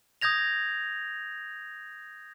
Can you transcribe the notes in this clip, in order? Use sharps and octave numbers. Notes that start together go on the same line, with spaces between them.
D#6 G6 G#6 A#6 F7